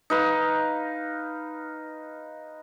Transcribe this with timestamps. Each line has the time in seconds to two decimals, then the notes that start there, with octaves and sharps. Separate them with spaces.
0.10 D#4 B4 F5